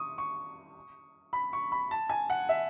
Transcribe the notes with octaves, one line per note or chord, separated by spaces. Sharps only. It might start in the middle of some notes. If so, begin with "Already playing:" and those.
Already playing: C#6 D#6
C#6
B5
C#6
B5
A5
G#5
F#5
E5